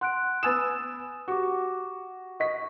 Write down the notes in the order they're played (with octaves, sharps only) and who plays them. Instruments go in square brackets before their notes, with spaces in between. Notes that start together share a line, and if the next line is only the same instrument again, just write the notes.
[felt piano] F#5 [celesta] C6 F#6 D7
[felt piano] B3 G#5 E7 [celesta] D#6 E6 A6
[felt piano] F#4 [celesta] G4 D6
[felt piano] D#5 B6 [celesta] C#6